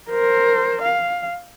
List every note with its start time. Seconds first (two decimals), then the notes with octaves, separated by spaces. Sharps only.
0.10 A#4 C5
0.82 F5